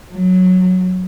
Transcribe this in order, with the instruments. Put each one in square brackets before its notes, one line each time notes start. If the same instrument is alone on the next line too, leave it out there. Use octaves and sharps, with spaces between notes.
[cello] F#3